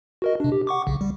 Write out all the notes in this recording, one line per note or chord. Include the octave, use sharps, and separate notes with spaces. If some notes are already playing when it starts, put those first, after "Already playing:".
F#4 A#4 D#5
C3 D4
G4
F#5 C#6 D6
B1 C#3
G3